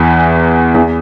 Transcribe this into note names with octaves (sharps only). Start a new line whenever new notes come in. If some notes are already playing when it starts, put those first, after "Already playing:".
Already playing: E2 E3
E2 E3